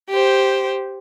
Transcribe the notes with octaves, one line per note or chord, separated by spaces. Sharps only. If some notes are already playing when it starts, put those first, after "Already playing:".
G4 C5